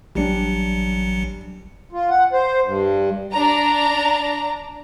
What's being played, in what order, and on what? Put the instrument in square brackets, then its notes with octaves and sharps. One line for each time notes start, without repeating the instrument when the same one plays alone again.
[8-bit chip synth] A1 F#3 C#7 [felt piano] G3 D4
[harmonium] F4
F#5
C5
G2
[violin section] D4 A#5